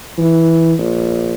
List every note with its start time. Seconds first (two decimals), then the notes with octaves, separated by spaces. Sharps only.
0.18 E3
0.78 A#1